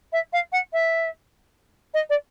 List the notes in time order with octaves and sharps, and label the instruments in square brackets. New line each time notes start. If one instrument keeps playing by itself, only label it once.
[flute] E5
F5
F#5
E5
D#5
D5